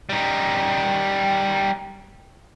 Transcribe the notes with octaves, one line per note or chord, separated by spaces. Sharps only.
G3 D#4